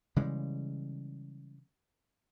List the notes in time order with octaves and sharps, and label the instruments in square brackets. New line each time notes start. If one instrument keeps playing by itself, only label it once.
[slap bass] C#3 E3 G3 G#3